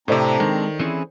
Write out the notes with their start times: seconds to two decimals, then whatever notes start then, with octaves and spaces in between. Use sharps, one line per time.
0.08 A2 C3 C4 D4 A4 C5 D5 A#5
0.40 D#3 G#3
0.79 E3 C4 C#4 E4 G#4